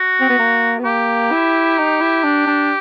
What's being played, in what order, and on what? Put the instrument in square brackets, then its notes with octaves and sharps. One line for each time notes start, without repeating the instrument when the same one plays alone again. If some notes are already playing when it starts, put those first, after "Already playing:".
Already playing: [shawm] F#4
[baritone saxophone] C4
B3
A#3
B3
[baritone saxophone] A#3 [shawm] G4
[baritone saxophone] E4
D#4
E4
D4
D4